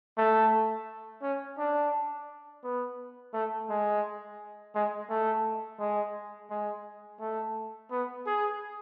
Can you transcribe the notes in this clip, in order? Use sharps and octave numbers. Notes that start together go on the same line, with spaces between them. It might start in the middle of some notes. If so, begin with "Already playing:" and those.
A3
C#4
D4
B3
A3
G#3
G#3
A3
G#3
G#3
A3
B3
G#4